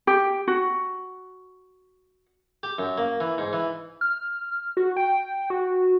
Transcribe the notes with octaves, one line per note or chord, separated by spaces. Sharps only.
G4
F#4
G4
F#2
A#3
E3
G#2
E3
F6
F#4
G5
F#4